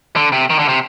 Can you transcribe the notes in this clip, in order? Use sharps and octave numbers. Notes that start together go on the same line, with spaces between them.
D3
C3
D#3
D3
C3